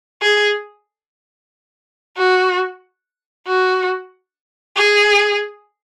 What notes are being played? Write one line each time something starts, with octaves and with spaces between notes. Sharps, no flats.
G#4
F#4
F#4
G#4